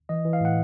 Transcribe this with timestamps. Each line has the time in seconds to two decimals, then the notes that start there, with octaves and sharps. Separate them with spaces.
0.09 E3 D#5
0.25 E3
0.33 F5
0.41 A2 F#5